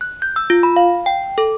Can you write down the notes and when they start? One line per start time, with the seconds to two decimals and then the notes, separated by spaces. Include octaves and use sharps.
0.01 F#6
0.22 G6
0.36 E6
0.50 F4
0.63 B5
0.76 F5
1.06 G5
1.38 A4